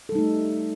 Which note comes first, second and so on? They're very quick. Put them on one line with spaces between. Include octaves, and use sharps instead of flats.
A4 G3 D#4 A3